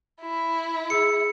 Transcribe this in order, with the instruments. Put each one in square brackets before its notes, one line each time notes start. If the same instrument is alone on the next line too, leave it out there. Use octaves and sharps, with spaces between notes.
[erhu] E4
[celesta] G#4 E6 [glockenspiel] C#7